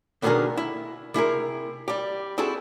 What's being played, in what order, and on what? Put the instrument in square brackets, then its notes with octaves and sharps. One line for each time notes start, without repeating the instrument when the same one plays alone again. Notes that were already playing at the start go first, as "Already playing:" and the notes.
[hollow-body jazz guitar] B2 D3 D#3 B3 G#4 A#4
E4
C3 E4 G#4 A#4
G3 G4
C4 E4 F#4 G#4 A4